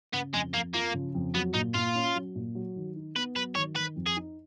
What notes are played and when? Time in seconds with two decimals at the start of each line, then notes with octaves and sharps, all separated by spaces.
0.14 C#3 B3
0.34 F2 G#3
0.54 F2 A#3
0.74 F3 A#3
0.94 C#3
1.15 F2
1.35 F#3 B3
1.54 A#2 D#4
1.74 A#2 F4
1.95 C#4
2.15 F#3
2.35 A#2
2.55 F#3
2.76 D#3
2.96 D#4
3.16 B3 B4
3.36 F#3 B4
3.56 D#3 C#5
3.76 D#3 B4
3.96 F2
4.06 G#4
4.17 D#4